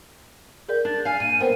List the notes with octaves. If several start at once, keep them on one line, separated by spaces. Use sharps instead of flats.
G#4 A#4 D5 G6
D4 A6
F5 G#5 F6
A#2 D#7
B3 A#4 C5 G5